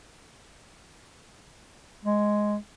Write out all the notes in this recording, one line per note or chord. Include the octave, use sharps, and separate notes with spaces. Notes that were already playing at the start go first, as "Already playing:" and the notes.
G#3